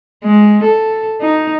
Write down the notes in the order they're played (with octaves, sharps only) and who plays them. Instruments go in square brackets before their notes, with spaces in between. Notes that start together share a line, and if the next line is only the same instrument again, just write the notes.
[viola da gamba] G#3
A4
D#4